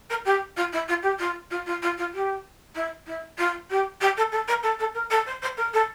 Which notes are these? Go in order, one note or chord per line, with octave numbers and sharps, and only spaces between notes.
A#4
G4
F4
E4
F4
G4
F4
F4
F4
F4
F4
G4
E4
E4
F4
G4
G4
A4
A4
A#4
A4
A4
A#4
A4
C5
C5
A#4
A4